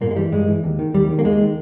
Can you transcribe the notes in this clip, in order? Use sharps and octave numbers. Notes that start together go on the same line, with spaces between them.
G2 A#2 A#3
G#3
E3 G3
G2 G#3
E3
D#2
D#3
D#2 G3
D#3
A#3
D#2 G#3
D#3